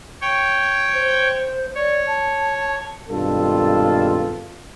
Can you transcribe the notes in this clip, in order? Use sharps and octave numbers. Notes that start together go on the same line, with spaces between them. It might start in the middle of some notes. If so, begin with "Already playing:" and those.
C#5 G5
C5
C#5 D5
A5
G#1 G2 B2 F4 A4